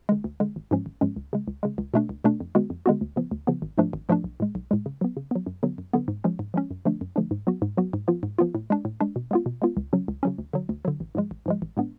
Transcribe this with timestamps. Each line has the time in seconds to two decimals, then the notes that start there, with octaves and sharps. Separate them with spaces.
0.09 D3 G#3
0.24 D2
0.40 D3 G#3
0.56 G#1
0.71 G#2 F3 G#3 C#4
0.86 G#1
1.01 G#2 F3 G#3 C#4
1.16 C#2
1.33 C#3 G#3
1.48 C#2
1.63 C#3 G#3
1.78 C#2
1.94 B2 A3 D4
2.09 C#2
2.24 B2 A3 D4
2.40 F2
2.55 D3 G#3 B3 F#4
2.70 F2
2.86 D3 G#3 B3 F#4
3.01 D2
3.16 C#3 F3 B3
3.31 D2
3.47 C#3 F3 B3
3.62 G#1
3.78 G#2 F3 A3 D4
3.93 G#1
4.09 G#2 F3 A3 D4
4.24 B1
4.40 A2 G#3
4.55 B1
4.71 A2 G#3
4.86 C#3
5.01 F#3 B3
5.17 C#3
5.31 F#3 B3
5.46 F#2
5.63 D3 F#3 B3
5.78 F#2
5.93 D3 F#3 B3
6.08 G#2
6.24 F3 G#3 C#4
6.39 G#2
6.54 F3 G#3 C#4
6.71 F#2
6.85 D3 F3 A3 D4
7.01 F#2
7.16 D3 F3 A3 D4
7.31 G#2
7.47 F#3 B3 F#4
7.62 G#2
7.77 F#3 B3 F#4
7.93 G#2
8.08 F3 B3 F4
8.23 G#2
8.39 F3 B3 F4
8.55 A2
8.70 G#3 D4
8.85 A2
9.00 G#3 D4
9.16 B2
9.31 G#3 B3 F4
9.46 B2
9.62 G#3 B3 F4
9.77 C#2
9.93 C#3 F#3 C#4
10.08 C#2
10.23 C#3 F#3 C#4
10.38 D2
10.53 D3 F#3
10.69 D2
10.85 D3 F#3
11.00 A1
11.15 G#2 F3 G#3
11.31 A1
11.46 G#2 F3 G#3
11.62 A1
11.77 A2 G#3 B3 D4